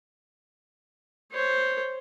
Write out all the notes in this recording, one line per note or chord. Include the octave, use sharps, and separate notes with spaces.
C5 C#5